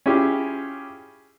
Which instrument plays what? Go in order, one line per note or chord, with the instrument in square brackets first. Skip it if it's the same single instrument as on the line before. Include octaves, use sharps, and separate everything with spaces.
[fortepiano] C#4 E4 F4 G4 G#4